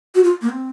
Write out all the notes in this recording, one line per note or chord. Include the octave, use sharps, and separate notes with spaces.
F#4
F4
A#3
C4